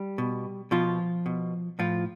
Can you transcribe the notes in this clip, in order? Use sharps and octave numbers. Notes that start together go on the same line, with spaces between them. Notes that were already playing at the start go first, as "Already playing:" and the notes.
Already playing: G3
B2
B2 F3 F4
B2
A2 F3 F4